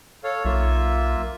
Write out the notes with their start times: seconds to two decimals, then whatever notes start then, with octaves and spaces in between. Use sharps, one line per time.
0.24 A4 C#5 F5
0.45 B1 A#3 F4 E5